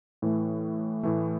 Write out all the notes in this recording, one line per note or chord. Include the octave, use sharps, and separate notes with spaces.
A2 E3 A3
A2 E3 A3